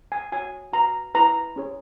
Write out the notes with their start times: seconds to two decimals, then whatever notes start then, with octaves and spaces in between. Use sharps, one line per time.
0.12 G#5
0.32 F#4 C#5 G#5
0.73 F#4 B4 A#5
1.14 E4 B4 A#5
1.56 C#4 G#4 C#5